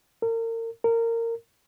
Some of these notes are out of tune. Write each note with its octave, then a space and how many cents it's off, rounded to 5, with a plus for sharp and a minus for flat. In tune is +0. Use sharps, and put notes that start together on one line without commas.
A#4 -35
A#4 -20